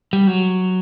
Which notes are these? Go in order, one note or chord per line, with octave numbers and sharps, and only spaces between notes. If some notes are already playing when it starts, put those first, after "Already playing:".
G3
F#3